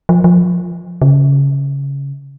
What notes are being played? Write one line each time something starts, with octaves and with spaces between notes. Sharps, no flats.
F3
F3
C#3